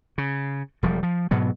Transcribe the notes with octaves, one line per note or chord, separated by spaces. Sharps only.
C#3
E1 F3 G3
F3
G#2 B2 F#3 B3